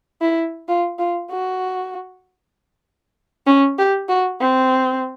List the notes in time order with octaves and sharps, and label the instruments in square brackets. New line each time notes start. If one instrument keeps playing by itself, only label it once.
[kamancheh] E4
F4
F4
F#4
C#4
G4
F#4
C4